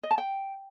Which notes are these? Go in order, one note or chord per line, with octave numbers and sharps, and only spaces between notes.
D#5
A5
G5